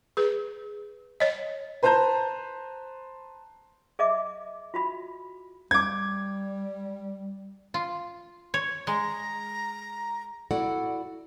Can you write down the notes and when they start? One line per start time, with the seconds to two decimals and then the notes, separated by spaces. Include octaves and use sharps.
0.17 G#4 B4
1.20 C#5 D#5
1.83 B4 C5 A5 A#5 G6
3.99 G#4 D#5 E5 D6
4.74 F4 F#4 B5
5.71 G3 D6 G#6
7.74 F4
8.54 C#5
8.87 G#3 A#5
10.51 E4 F#4 A4 D5 F#5